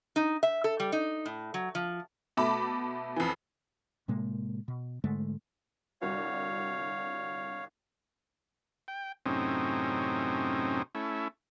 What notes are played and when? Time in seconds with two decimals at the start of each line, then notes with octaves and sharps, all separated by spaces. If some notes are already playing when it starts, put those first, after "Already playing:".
0.16 D#4
0.43 E5
0.64 A4
0.80 G3
0.92 D#4
1.26 A2
1.54 F#3
1.75 F3
2.37 B2 A3 A5 B5 D6
3.16 F2 E3
4.08 A2 C3 G#3 A#3
4.68 B2
5.04 G#2 D3 G#3 A3
6.02 G1 C2 F#4 C#5 F5
8.88 G5
9.26 F#2 A2 C3 C4 C#4 D#4
10.95 A3 C#4 E4